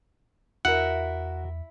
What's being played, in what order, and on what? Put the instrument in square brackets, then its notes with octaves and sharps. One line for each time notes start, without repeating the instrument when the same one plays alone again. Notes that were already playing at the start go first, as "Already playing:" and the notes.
[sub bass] E2 [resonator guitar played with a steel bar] E4 [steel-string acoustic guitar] F#4 A#4 [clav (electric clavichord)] F#5